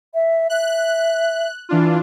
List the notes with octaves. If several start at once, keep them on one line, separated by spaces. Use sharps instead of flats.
E5
E5 F#6
E3 D4 F4